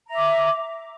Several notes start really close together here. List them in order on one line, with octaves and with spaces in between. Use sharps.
A#5 E5 D6